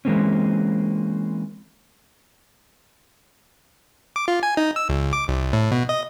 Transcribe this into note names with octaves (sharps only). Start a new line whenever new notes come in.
E3 G#3 A#3 C4 C#4
D6
F4
G#5
D#4
E6
C#2
D6
C2
A2
B2
D#5